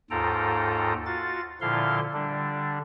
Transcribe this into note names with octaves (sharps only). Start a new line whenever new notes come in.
D#2 G#2 F4 A4 G5 A#5
F4 F#4 A6
A#2 D3 F3 E4 F5 C6
D3 G3 D4